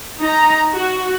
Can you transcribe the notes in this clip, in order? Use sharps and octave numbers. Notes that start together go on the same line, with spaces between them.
D#4 A#5
F#4